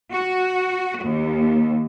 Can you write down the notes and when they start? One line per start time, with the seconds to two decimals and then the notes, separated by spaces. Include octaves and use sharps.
0.13 F#4
1.01 D#2